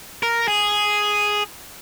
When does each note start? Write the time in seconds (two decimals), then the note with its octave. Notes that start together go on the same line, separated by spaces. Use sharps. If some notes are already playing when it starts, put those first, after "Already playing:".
0.23 A#4
0.48 G#4